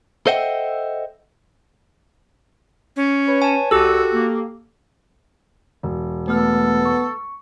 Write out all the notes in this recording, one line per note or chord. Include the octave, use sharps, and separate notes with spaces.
A4 C5 D#5 E5 F#5 G5
C#4
B4 C#5
G#5 A5
C2 F#4 G4 A4 E6
A#3
E1
A3 B3 A4 F6
C#6